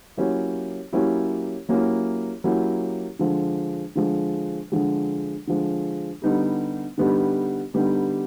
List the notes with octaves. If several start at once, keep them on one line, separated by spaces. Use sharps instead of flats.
F#3 A#3 C#4 E4 G4
F#3 A#3 C#4 E4 G4
F#3 A#3 C#4 E4 G4
F#3 A#3 C#4 E4 G4
D3 F3 G#3
D3 F3 G#3
D3 F3 G#3
D3 F3 G#3
D3 G3 B3 D#4 G4
D3 G3 B3 D#4 G4
D3 G3 B3 D#4 G4